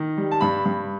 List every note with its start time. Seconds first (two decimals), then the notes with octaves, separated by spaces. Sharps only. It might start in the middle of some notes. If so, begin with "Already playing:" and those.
Already playing: D#3
0.17 G3
0.31 A5
0.41 G2 B5
0.66 G2